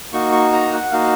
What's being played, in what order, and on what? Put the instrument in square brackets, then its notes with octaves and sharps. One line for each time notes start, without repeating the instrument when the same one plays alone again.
[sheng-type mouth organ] A#3 D#4 F#4 C#6
C#6
A#5
F#5
A#3 D#4 F#4 F5